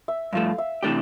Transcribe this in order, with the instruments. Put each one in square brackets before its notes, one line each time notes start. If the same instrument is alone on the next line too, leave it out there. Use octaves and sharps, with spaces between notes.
[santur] E5
[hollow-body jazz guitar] G2 F3 A3 [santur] F5
[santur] E5
[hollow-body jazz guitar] C3 E3 A3 D4 G4 [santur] D5